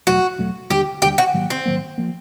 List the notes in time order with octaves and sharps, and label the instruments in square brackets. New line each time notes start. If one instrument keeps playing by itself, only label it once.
[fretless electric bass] E2 B2 F#3 A3 [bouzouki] F#4
[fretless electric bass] E2 B2 F#3 A3
[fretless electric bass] D#2 D3 G3 [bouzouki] G4
[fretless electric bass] D#2 D3 G3 [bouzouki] G4
[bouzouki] F#4
[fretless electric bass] G#2 D#3 F#3 A#3
[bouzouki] C4
[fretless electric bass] G#2 D#3 F#3 A#3
F3 A#3